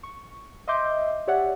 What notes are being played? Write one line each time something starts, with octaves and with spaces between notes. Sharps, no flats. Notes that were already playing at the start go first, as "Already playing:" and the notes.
C#6
D#5 E5 C6 D6 G6
G4 C#5 D5 E5 F#5